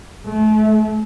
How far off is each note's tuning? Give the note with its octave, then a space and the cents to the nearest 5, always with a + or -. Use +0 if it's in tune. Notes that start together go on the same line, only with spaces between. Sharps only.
A3 -35